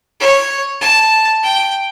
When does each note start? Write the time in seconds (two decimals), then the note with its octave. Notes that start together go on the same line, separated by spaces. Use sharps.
0.20 C#5
0.81 A5
1.43 G5